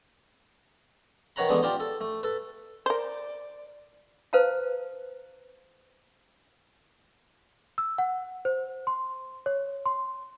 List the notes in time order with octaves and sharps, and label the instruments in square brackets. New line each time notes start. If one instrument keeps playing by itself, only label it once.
[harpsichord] D#3 B4 C#5 F#5 A#5 B5
D3 E3 G#3 A3 B3 D4
D4 F4 G4 C5
A4
A3
A4 B4
[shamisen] A#4 C5 [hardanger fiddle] D5
[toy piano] B4 C5 F5 A5 A#5
[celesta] E6
F#5
C5
C6
C#5
C6